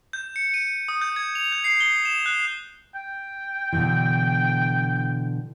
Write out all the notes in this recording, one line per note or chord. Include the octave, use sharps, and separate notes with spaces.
G6
C#7
D#7
D#6
G6
G#6
F7
G6
C7
G7
E7
F#6
G5
B2 D3 E3